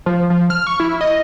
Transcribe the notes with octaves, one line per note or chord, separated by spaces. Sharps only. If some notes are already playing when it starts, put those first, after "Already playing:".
F3
F3
F6
C#6
E4
D#5